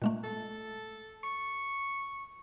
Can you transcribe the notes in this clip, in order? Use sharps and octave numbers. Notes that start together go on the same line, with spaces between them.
A#2 G#3 A3
A4
C#6